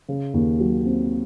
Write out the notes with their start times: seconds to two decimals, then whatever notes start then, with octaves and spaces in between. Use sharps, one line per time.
0.09 C#3
0.34 D#2
0.60 F#3
0.86 C4